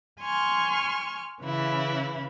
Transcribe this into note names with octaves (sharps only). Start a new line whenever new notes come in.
G#5 C6 C#6 F6
C#3 E3 E4 F5